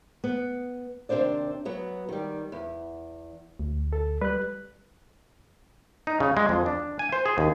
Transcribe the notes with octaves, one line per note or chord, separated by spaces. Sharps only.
B3
D#2 C3 A3 D4 C5 D5
F#3 B3
D#3 G3
E2
D2
A4
G3 B4 F#6
D#4
C#3
G#3
F2
D4
G#5
C5
G#4
D#2